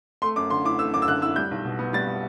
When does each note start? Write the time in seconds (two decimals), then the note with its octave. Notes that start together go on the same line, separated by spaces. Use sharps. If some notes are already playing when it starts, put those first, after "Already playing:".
0.22 A3 C6
0.36 F#2 D6
0.50 D3 C6
0.64 E4 D6
0.79 A3 E6
0.94 F#2 D6
1.02 E6
1.08 D3 F#6
1.22 E4 E6
1.36 G3 G6
1.51 B1
1.65 B2
1.79 B3
1.93 G3 A6